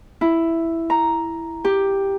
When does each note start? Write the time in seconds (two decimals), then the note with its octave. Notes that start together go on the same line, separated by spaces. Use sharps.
0.21 E4
0.90 A#5
1.65 G4